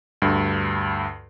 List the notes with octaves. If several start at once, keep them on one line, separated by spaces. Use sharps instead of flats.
D2 G2